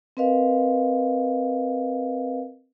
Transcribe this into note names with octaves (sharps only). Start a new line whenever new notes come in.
C4 A#4 B4 D#5 F5